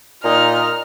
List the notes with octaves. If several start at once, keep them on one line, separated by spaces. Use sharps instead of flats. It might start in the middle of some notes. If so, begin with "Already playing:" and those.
A#2 D#4 F6